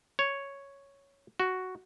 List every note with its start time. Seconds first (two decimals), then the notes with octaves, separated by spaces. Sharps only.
0.19 C#5
1.40 F#4